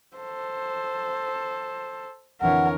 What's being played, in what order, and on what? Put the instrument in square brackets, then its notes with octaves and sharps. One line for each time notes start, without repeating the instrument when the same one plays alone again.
[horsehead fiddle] A4 C5
[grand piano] F2 D3 E3 [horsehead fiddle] A#4 C#5 [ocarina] F#5